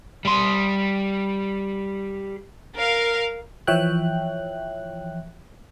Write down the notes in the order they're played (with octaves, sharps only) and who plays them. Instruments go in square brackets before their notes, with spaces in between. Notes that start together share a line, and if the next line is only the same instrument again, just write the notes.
[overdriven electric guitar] G3 C6
[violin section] A#4 F5
[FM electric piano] E3 F3 C#5 E5 G5 F#6